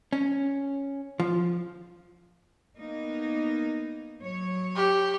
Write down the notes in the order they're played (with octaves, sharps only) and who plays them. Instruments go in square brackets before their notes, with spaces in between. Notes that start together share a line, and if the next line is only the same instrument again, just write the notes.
[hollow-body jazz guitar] C#4
F3
[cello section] A#3 B3 D#4
F#3 C#5
[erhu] G4